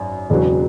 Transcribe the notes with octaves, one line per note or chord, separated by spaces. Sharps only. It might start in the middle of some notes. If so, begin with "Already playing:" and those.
Already playing: G#1 F#2
E1 E2 C#3 F#3